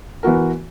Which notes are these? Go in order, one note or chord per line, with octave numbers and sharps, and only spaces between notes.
E3 B3 F#4 A#4